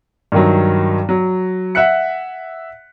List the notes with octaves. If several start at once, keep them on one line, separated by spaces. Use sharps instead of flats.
G2 D#3 F#3
F#3
E5 F#5 F#6 C#7